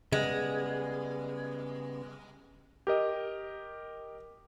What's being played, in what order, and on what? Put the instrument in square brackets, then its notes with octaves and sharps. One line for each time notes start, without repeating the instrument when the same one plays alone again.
[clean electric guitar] C#3 G3 B3 [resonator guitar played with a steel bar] G#3
[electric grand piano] G4 A#4 D#5